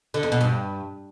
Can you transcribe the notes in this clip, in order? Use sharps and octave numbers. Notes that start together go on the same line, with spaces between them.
D3
E2
B2
G2